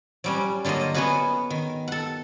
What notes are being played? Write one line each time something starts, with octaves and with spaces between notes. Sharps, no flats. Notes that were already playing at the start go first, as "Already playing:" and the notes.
F#3 G3 C#4
D3 F#3 A#3 F4 D#5
B3 C#4 F#4 G#4 B4 F#5
D#3
A4 F#5